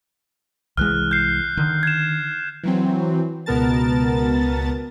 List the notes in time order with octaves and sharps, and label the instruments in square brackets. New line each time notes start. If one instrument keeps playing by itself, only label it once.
[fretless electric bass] C2 E3 G#3 [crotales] F6 F#6
[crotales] G6 C7
[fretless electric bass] D3 D#3
[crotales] G#6 E7
[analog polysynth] E3 F#3 C4
C#2 B2 B3 A#4 A5 A6